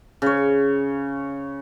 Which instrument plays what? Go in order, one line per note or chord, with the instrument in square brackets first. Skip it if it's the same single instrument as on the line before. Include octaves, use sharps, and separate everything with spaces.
[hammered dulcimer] C#3 C#5